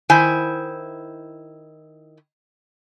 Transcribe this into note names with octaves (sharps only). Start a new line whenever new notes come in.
D#3 E4 C5 G#5